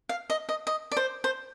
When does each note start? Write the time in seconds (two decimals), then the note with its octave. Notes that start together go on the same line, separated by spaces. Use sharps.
0.09 F5
0.30 D#5
0.49 D#5
0.67 D#5
0.92 D5
0.97 C5
1.24 C5